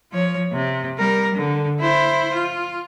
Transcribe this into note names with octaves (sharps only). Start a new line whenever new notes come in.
F3 C#5
C3
G3 A#4
D3
E4 C5
F4